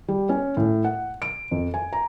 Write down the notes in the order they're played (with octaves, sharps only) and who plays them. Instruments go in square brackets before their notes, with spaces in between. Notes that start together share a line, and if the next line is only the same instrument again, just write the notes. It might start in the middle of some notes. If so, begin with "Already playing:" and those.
[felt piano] G3
C#4
A2
F#5
D7
F2
G#5
A#5